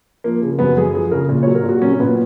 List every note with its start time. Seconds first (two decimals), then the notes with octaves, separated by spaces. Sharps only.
0.24 F3 A#3
0.42 C#3
0.59 F#2 B3
0.77 F#2 G#4
0.94 F3 G#4
1.11 C#3 A#4
1.29 A#2
1.43 F#3 C#5
1.55 A#4
1.64 A#2
1.69 F#4
1.82 F#3 C#4
1.94 C#4
2.00 A#2 B3